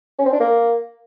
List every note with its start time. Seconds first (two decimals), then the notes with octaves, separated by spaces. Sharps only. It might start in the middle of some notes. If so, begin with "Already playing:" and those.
0.19 C#4
0.26 C4
0.33 D4
0.40 A#3